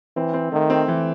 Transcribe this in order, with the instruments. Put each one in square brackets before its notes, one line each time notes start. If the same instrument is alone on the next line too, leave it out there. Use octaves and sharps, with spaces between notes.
[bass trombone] E3 [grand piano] C4
[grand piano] C4
[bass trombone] D#3 [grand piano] A3
[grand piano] C4
E3